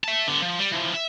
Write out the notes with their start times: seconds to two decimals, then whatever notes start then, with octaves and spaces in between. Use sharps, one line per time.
0.04 E5 A5
0.27 D3 B3
0.42 F3
0.59 G3
0.72 E3 F3
0.94 E5